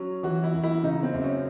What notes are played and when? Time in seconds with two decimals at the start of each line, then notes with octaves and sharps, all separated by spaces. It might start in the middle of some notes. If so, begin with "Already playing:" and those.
Already playing: F#3 C#4
0.23 E3 F#4
0.44 E4
0.53 F#2
0.64 E4
0.83 C#3 D#4
1.03 C4
1.14 F#2
1.23 C#4